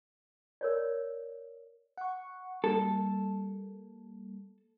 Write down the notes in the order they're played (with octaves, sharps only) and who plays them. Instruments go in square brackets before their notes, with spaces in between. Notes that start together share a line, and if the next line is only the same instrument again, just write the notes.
[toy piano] A#4 C#5 D5
[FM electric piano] F#5 C#6
[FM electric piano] G3 A#3 [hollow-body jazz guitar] A4